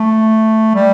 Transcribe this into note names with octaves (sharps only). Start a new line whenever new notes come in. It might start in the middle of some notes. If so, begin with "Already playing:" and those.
Already playing: A3
G3